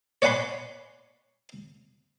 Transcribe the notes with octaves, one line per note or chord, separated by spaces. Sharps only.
C#5 D5 F#5 G#5 B5 C6